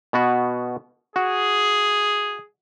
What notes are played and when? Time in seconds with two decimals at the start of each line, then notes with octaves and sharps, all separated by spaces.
0.13 B2 B3 F#4
1.16 F#4 G#4